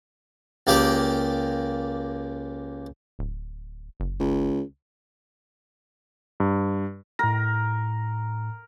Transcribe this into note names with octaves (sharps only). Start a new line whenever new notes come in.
C#2 A#3 G4 D5
D1
F#1
C#2
G2
A2 A#4 A#6